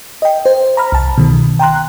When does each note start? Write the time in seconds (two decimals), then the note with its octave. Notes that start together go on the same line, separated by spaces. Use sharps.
0.22 D#5 G5
0.46 C5
0.77 A#5 B5 F6
0.92 C2 A5
1.18 B2 D#3
1.59 G5 A#5 C6 F#6